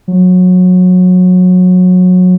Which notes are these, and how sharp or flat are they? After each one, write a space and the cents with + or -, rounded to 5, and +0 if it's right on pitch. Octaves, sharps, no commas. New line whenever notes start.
F#3 -25